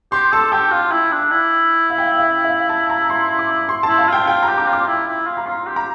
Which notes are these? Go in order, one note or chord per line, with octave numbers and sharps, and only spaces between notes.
G4 C6
A4 A5
G4 G5
F4
E4
D4
E4
F5
G5
F5
E5
E5
F5
A5
A#5
C6
D6
C6
A5
E4
F5
F4 G5
F4 G5
A#5
G4
D6
F4
D6
E4
E4
F4
A#5
F4 C6
G4
A#5